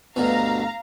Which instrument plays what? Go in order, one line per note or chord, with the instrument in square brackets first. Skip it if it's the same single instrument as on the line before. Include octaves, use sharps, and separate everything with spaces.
[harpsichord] D2 G2 B2 [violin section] F5 A#5